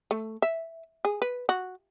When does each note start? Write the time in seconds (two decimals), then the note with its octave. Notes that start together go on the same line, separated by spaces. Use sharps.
0.11 A3
0.42 E5
1.05 G#4
1.22 B4
1.49 F#4